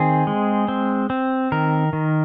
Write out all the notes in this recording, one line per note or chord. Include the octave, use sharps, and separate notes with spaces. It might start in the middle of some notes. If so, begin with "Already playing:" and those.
Already playing: D#3 C4 G#4
G#3
C4
C4
D#3 A#4
D#3